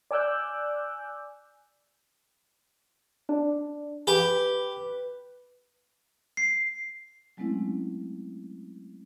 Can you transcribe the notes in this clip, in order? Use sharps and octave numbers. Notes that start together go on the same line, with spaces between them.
D5 G#5 D6 E6 F#6 G6
D4
G4 B4
C7
F#3 G#3 A3 C4 C#4 E4